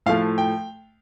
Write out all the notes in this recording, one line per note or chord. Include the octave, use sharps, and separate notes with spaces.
A2 F3 A3 F5
G5